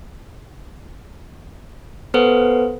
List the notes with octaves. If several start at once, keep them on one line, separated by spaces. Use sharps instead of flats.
B3 A4 B4 C5 F#5